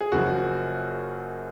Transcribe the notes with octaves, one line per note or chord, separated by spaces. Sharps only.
G#4
F#1 F#2 F3 F#4